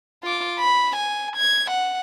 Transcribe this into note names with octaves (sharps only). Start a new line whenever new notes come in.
F4 D6
B5
G#5
G#6
F#5